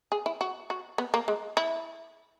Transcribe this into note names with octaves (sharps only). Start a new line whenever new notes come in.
G#4
E4
F#4
F#4
B3
A#3
G#3
E4